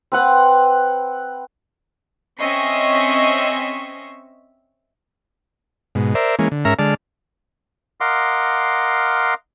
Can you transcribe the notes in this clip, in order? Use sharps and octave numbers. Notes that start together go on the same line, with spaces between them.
C4 B4 F#5
C4 C#4 D#5 E5 C#6 C7
G#2 B2
A#4 C5 D5 E5
E3 G#3 A#3 C#4
D3
G#2 C#4 A#4 E5 A#5 F6
D3 G#3 D5 A5 F6
A#4 D#5 F5 F#5 C6 D6